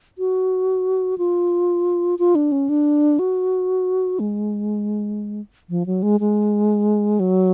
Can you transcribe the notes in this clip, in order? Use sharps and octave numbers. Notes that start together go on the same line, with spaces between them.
F#4
F4
F4
D4
C#4
D4
F#4
G#3
F3
F#3
G#3
G#3
F#3